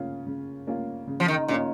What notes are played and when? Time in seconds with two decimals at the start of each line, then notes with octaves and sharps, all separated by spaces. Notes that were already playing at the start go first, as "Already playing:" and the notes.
Already playing: C#3 A#3 C#4 F4
0.26 C#3
0.67 A#3 C#4 F4
1.07 C#3
1.20 F3
1.28 D#3
1.48 A#2 A#3 C#4 F4